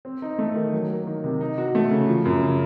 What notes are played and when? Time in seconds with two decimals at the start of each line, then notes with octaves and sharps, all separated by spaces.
0.05 C4
0.22 D#4
0.38 A3
0.55 D#3
0.73 F#3
0.90 A#3
1.07 D#3
1.24 C3
1.41 D#4
1.58 F#4
1.75 A3
1.91 C#3
2.08 F3
2.25 F#2
2.43 C#3